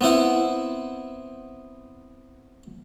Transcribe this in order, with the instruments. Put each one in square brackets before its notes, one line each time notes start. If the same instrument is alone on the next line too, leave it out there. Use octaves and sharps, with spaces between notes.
[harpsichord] B3 C4 E4 F#5